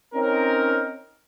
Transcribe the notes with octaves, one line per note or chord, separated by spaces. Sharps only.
C4 C#4 D#4 A#4